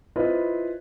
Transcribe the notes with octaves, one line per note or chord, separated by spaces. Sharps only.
E4 F4 B4 C5 D#5